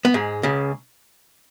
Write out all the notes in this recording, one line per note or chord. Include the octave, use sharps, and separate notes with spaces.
B3
G#2 G#3
C#2 C#3